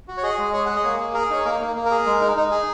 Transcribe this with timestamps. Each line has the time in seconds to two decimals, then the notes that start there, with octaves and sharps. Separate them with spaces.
0.08 F#4
0.18 C#5
0.23 G#4 D#5
0.38 G#3
0.53 G#4 C#5
0.66 G#4 F#5
0.75 D#5
0.84 A#3 C#5
1.00 G#4
1.14 G#4 A#4
1.30 D#4 C#5
1.45 A#3 A#4
1.60 A#3
1.76 A#3
1.85 A#4
1.91 G#4
2.06 G#3
2.21 D#4
2.37 D#4
2.51 G#4